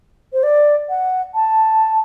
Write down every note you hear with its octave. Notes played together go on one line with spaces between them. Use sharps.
C5
D5
F#5
A5